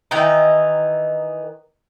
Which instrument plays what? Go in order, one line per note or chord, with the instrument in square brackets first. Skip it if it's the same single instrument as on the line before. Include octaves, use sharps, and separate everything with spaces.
[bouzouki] D#3 E3 D#4 A#5